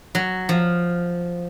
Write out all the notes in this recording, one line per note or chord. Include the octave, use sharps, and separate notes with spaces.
F#3
F3